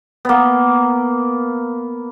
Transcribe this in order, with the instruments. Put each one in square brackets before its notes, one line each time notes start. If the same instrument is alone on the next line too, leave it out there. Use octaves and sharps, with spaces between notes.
[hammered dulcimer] A#3 B3